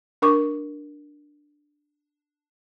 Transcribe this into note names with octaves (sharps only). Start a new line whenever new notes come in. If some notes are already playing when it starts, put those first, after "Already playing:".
D4 A#4 C#6 D6